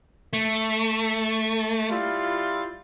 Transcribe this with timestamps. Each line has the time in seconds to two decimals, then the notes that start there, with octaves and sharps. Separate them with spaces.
0.33 A3
1.90 G3 E4 F4